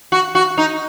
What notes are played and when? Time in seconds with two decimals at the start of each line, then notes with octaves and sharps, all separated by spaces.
0.12 F#4
0.35 F#4
0.58 D#4